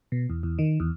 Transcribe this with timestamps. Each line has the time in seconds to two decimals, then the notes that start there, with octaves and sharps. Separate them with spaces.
0.12 B2
0.30 E2
0.43 E2
0.59 D#3
0.80 E2